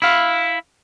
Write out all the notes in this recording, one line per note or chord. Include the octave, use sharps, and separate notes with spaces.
E4 F5